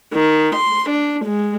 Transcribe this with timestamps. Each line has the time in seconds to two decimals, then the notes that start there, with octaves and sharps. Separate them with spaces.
0.13 D#3
0.56 C6
0.90 D4
1.25 G#3